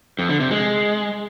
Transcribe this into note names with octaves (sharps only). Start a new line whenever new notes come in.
F2
D3
C3
G#3